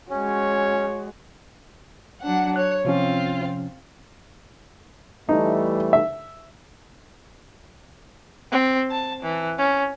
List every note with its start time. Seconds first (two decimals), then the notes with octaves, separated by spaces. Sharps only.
0.10 G#3 C#4 F#4 C#5
2.21 F#3 D4 F#5
2.56 C#5 F#6
2.85 C3 F3 C4 C#4 F4
5.29 E3 G3 A3 D#4
5.93 E5
8.52 C4
8.91 A5
9.23 E3
9.58 C#4